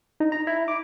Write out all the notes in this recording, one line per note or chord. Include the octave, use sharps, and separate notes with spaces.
D#4
A#5
E4
D6